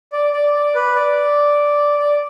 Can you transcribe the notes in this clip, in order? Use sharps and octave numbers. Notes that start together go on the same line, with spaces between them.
D5
D5
D5
B4
D5
D5